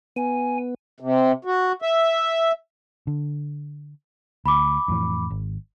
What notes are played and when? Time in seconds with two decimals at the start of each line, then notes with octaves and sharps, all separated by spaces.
0.16 B3 G#5
1.00 C3
1.45 F#4
1.82 E5
3.07 D3
4.46 D2 B5 D6
4.88 F2 A2 E3
5.30 G#1